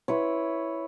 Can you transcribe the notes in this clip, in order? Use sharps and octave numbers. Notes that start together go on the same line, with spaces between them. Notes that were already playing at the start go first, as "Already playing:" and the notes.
E4 B4 C#5